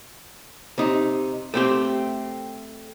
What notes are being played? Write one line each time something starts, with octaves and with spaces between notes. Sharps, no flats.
C3 D#4
A3 C4 G4